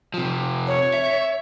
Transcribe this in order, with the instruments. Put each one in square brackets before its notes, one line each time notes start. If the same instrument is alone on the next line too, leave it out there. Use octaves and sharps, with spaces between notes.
[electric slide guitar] C3 F3
[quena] C#5
[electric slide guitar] E5